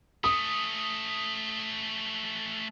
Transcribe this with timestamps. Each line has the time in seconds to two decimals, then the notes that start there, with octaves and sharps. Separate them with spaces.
0.24 A3 C#4 D#6